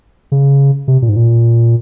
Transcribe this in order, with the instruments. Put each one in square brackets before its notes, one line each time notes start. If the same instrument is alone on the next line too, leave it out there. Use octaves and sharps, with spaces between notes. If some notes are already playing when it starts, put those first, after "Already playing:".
[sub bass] C#3
C3
A#2
G#2
A#2